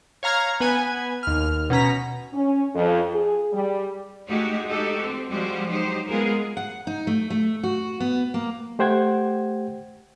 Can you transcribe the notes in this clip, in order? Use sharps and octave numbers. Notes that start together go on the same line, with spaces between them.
C#5 F5 A#5 F6 G#6
B3 B4 G#5
D#2 F6
B2 C#4 A#5 B6
C#4
F2
G#4
G3
G#3 A3 D#4 F#4 G4
D#4 F#4 G4 A4
C4
F3 G3 G#3 F#4 G4 C5
F#3 D#4 G4 C5
G#3 B3 F4 G#4 A#4
F#5
D#4
A3
A3
F#4
B3
A#3
A3 G4 C5 F#5 G5 G#6